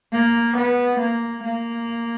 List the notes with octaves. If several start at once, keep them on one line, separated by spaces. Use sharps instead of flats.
A#3
B3
A#3
A#3